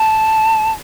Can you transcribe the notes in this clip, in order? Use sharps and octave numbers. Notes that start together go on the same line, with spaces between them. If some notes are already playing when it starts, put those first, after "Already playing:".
Already playing: A5